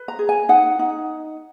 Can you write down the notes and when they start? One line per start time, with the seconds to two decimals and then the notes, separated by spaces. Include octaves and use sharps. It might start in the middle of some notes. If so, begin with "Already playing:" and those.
Already playing: B4
0.08 A#5
0.19 G#4
0.29 G#5
0.49 D#4 F#5
0.79 D#4